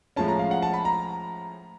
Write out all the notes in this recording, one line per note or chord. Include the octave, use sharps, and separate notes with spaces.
A2 F3 G#3 C#4 A5
A#5
F5
F#5
A5
B5
A#5